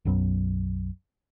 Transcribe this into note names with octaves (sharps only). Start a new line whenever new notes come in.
B1 F#2 F#3 B3